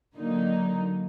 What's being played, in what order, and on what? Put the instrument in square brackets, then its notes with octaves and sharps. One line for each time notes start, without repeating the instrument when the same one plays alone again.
[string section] D3 F#3 A#3 D#4